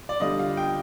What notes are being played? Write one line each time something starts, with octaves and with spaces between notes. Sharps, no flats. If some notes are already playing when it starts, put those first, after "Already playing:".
D5
D3 G3 D4 F4 D#5
F5
G5